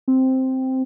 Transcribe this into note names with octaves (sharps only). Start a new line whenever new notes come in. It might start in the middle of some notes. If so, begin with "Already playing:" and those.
C4